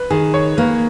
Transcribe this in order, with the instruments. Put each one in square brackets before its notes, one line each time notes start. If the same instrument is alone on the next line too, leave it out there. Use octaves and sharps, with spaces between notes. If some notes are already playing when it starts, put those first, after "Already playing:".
Already playing: [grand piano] B4
[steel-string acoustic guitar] D#3 [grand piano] G#4
[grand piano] C#5
[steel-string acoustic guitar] A#3 [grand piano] B4